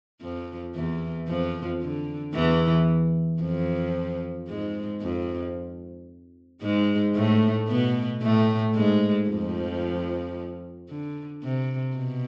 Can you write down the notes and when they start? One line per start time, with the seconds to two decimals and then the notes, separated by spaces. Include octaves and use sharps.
0.21 F2 F3
0.75 E2 E3
1.28 F2 F3
1.81 D3
2.34 E2 E3
3.42 F2 F3
4.48 G#2 G#3
5.02 F2 F3
6.62 G#2 G#3
7.15 A2 A3
7.69 B2 B3
8.22 A2 A3
8.75 G#2 G#3
9.29 F2 F3
10.89 D3
11.43 C3
11.96 B2